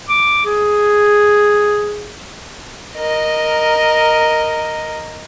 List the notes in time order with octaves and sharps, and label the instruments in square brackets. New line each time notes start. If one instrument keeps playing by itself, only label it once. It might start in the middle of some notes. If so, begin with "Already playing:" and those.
[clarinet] D6
G#4
[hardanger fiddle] A#4 D#5